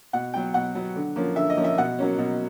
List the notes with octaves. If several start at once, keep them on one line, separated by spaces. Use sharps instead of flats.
B2 F#5
F#3 B3 G5
B2 F#5
F#3 B3
D3
F3 A#3 C#4
D3 E5
D#5
F3 A#3 C#4
E5
B2 F#5
F#3 A#3 C#4
B2